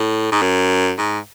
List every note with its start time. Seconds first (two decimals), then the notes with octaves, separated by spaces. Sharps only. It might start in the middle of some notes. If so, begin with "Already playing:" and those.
Already playing: A2
0.32 G#2
0.42 F#2
0.98 G#2